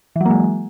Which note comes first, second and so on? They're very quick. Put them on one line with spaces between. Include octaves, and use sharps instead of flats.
E3 F#3 A#3 G#3